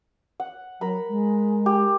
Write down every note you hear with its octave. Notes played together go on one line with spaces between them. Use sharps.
F#5
F#3 A#4 B5
G#3
G4